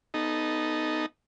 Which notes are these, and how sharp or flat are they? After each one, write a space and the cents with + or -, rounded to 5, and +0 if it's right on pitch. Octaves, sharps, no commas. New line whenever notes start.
B3 +5 D#4 -5 A4 -20